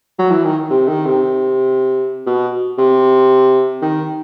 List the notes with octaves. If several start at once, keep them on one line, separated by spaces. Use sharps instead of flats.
F#3
E3
D#3
C3
D#3
C3
B2
C3
D#3